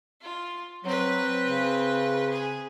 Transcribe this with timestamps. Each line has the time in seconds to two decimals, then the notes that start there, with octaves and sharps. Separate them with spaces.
0.21 F4
0.85 F#3 C4 B4
1.46 C#3
2.30 G#4